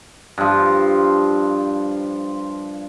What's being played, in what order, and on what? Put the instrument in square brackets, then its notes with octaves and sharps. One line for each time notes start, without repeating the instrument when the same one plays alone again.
[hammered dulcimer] G2 F3